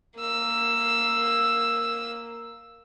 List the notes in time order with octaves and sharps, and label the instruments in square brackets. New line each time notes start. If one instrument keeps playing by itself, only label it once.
[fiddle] A#3 E6